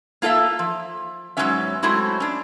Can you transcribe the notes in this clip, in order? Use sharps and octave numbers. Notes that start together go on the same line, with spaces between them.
A#3 F4 A4 D#5 E5
F3
G#2 F3 F#3 B3 C#4 E5
F#3 G#3 A3 C4 E4 F#4
C#4 D4